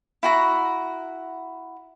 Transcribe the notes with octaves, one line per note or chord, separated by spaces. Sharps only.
E4 F#4 A#5